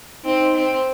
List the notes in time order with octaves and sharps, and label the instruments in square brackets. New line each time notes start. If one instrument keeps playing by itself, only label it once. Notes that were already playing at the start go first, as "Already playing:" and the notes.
[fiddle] C4 [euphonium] D#4
[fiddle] C4